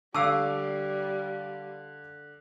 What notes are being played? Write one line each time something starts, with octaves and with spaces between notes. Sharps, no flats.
D3 G3 F5 A5 C#6 D6 E6 C7